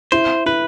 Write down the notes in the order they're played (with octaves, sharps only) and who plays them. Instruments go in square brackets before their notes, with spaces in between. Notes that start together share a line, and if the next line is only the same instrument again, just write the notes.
[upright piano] E4 [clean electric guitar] C5
[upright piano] E4 [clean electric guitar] B4